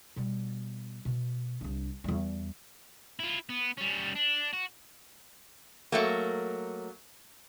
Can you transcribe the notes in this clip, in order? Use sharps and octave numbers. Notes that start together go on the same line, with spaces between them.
B2 G3
B2
C2 D4
E2 G3
E4 F4
B3
G3 C#4
D4
F#4
F#3 A3 A#3